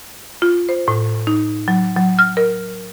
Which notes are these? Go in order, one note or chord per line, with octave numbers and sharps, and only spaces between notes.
F4
C5
A2
D#4
F#3
F#3
F6
A#4